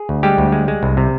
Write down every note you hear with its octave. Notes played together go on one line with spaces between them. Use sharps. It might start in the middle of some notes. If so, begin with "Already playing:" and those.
Already playing: G#4
D2
G3 G#3 G4
D2
G#3
G#3
C2
C3